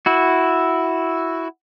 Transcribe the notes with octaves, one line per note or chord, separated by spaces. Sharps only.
E4 F#4